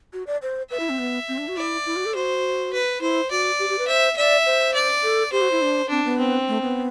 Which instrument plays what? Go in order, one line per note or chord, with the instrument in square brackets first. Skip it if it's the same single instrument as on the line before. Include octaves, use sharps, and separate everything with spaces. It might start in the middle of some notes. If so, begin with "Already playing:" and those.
[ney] F#4
D5
C5
[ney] B4 [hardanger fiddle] E5
[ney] E4
C4
B3
C4
D4
F#4
[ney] E4 [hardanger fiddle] D5
[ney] E4
F#4
A4
[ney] F#4 [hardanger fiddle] C5
[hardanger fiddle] B4
[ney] E4 [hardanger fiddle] C5
[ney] F#4 [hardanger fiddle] D5
[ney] G4
G4
B4
[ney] C5 [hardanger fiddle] E5
[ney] D5 [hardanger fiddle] E5
[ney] C5
[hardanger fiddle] D5
[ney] A4
[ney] G4 [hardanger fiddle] C5
[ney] F#4
E4
D4
[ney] C4 [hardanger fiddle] D4
[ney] B3
[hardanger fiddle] C4
[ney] A3
B3